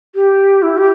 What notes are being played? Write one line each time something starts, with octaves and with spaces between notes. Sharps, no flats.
G4
E4
G4